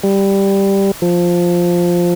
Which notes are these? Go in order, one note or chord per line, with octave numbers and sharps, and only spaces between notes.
G3
F3